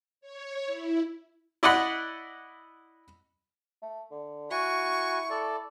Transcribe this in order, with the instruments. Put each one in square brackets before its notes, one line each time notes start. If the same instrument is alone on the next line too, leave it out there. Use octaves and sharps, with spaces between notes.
[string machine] C#5
E4
[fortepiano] E4 D5 D#5 F#5 B5
[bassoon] A3
D3
[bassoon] E4 [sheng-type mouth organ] F#4 G#5 [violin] C#6
[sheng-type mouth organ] A4 D5